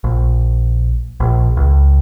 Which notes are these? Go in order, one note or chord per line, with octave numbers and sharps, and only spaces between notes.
A#1
A#1
C#2